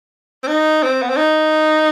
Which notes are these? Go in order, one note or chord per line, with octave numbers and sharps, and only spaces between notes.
C4
D#4
C4
B3
C4
D#4